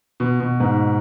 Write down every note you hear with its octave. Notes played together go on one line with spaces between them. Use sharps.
B2
B2
G#2